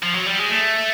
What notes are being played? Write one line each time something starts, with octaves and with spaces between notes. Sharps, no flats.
F3
F#3
G3
G#3
A3